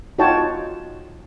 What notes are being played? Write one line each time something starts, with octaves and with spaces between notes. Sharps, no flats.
D#4 F4 F#4 C#5 G5 A5